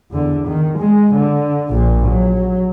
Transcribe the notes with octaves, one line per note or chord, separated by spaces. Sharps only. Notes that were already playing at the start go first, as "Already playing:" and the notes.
E2 D3
D#3
G#3
D3
A#1 A#2
F#3